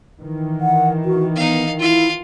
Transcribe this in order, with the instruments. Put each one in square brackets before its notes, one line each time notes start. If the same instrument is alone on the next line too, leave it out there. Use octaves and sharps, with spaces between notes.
[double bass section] D#3 E3
[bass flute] F#5
F#4
[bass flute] B3 [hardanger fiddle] D#4 F5
[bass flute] E4 [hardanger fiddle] F4 F5